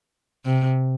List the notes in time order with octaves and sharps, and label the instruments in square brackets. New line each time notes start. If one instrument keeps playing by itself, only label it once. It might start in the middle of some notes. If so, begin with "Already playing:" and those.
[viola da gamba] C3